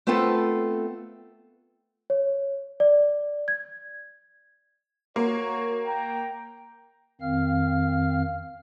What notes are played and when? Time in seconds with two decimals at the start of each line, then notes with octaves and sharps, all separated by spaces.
0.07 A3 B3 C4 F4 A4 B4
2.10 C#5
2.80 D5
3.48 G#6
5.16 A#3 F#4 C#5
5.86 G5 A#5
7.21 F2 D#3 C4 F5 F6